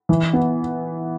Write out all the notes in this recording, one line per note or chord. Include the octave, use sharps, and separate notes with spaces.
E3
B3